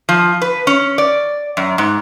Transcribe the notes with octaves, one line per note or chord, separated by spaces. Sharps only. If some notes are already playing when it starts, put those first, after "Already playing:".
F3
B4
C#4
D5
F#2
G#2